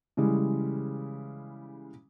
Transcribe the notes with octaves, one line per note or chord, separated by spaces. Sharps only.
C#3 E3 G3 G#3